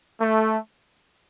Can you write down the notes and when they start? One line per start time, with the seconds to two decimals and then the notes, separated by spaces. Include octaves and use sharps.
0.20 A3